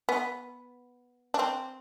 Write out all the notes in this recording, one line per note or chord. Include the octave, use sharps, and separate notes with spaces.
B3
D4
C4